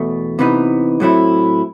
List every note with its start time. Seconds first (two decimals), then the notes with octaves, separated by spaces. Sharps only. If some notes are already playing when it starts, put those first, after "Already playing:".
Already playing: E2 B2 A3
0.39 C3 E3 B3 D#4
1.00 A2 F#3 A3 C4 E4